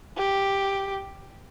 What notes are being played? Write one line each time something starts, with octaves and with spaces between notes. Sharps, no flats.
G4